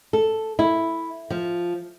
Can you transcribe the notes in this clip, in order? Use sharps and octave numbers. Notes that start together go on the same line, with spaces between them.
A4
E4
F3